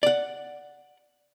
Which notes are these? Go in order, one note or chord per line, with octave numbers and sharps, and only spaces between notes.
D5 F#5